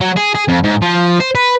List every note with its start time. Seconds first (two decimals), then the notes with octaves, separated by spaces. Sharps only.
0.01 F#3
0.17 G#4
0.35 G#4
0.49 F2
0.64 G#2
0.82 F3
1.20 C5
1.35 B4